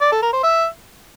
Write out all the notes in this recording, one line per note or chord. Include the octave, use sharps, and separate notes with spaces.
D5
A4
A#4
C5
E5